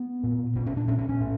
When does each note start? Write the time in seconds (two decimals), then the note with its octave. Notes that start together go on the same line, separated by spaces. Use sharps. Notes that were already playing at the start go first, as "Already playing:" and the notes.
Already playing: B3
0.24 A#2
0.56 A#2 C#4
0.66 C#4
0.77 D4
0.88 A#2 C#4
0.98 C#4
1.09 C#4
1.20 A2